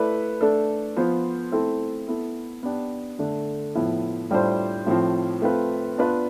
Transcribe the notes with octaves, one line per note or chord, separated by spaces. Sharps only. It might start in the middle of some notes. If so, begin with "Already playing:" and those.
Already playing: A3 E4 B4 D5
A3 D4 A4
F3 B3 F4 C5
A3 C4 E4 A4
B3 E4 A4
B3 D4 G4
D3 A3 D4
A2 F3 B3 E4
A2 G3 D4 F4 C5
A2 F3 C4
A3 C4 F4 B4
B3 D4 F4 B4 D5